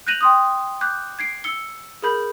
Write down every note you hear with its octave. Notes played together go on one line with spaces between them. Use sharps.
F#6 G6 A#6 D#7 F7 F#7
G5 C6 D#6
D6 F#6 G6
G#6 C7 D7
E6 C#7 G7
G#4 A#4 B5 G6